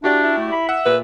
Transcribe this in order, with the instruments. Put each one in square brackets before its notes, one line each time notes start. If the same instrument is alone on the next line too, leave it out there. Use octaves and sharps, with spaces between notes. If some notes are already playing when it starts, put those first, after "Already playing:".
[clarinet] D4 [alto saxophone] E4 [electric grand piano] F#4 G4 D5
[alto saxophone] E4
[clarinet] A3
B5
[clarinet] E5 [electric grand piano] F#5
[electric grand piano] A#2 [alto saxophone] B4